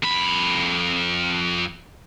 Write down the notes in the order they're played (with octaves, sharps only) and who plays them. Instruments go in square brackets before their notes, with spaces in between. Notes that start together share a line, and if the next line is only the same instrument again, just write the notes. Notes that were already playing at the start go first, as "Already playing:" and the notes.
[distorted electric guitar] F2 B5